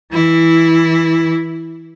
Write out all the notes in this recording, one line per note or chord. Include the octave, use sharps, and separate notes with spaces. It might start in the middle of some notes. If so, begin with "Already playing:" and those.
E3 E4